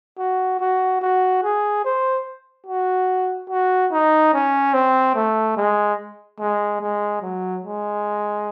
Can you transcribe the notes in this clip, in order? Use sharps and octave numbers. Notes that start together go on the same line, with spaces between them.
F#4
F#4
F#4
G#4
C5
F#4
F#4
D#4
C#4
C4
A3
G#3
G#3
G#3
F#3
G#3